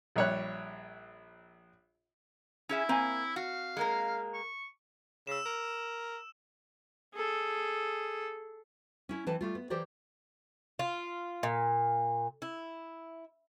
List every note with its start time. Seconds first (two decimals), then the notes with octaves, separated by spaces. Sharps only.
0.16 A#1 G3 C#5 E5 F#6
2.69 C#4 E4 G#4 E5
2.89 A#3 C4 G#5
3.36 F#4 F5
3.77 G#3 A#3 A#4
4.34 C#6
5.27 C#3 E6 E7
5.46 A#4
7.14 G#4 A4
9.09 C#4 E4
9.27 E3 C4 B4 A5
9.41 G3 A3 F4
9.55 B3
9.70 E3 G4 A#4 C5 D5
10.79 F4
11.43 A#2
12.42 E4